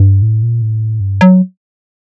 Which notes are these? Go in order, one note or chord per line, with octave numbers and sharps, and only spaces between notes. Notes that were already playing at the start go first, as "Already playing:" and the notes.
Already playing: G2
A2
A#2
A2
G2
F#3